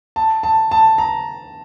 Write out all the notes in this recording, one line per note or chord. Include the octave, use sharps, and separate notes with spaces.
A5
A5
A5
A#5